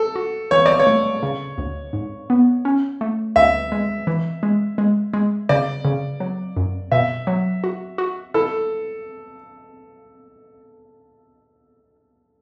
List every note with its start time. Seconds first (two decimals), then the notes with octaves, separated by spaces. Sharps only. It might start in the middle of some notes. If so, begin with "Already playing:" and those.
Already playing: A4
0.16 F#4
0.51 E3 C#5
0.66 D5
0.80 C#5
0.87 A3
1.23 C#3
1.58 D2
1.93 G#2
2.30 B3
2.65 C#4
3.01 A3
3.36 D2 E5
3.72 G#3
4.07 E3
4.43 G#3
4.78 G#3
5.14 G#3
5.49 C#3 D5
5.85 C#3
6.20 F#3
6.57 F#2
6.92 B2 E5
7.27 F#3
7.64 F#4
7.98 F#4
8.34 E4 A4